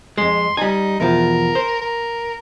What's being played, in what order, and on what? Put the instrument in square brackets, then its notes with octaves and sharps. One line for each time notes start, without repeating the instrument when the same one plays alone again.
[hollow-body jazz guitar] F2 G#3 [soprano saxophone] C6
[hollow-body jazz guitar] G3 G#5 [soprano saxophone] D#4
[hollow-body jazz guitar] E2 B2 F3 [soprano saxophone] A#4
[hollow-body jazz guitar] C5
[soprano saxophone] A#4